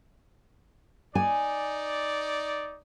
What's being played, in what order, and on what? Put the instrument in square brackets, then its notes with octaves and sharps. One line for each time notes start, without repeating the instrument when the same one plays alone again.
[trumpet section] D#4 D5 [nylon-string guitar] G#5